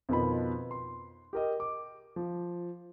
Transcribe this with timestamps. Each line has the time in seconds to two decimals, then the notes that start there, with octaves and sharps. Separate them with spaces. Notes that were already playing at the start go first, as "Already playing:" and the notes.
0.09 F2 B2 D#3 F4 B4 B5
0.71 C6
1.33 G4 A#4 D#5
1.60 D6
2.16 F3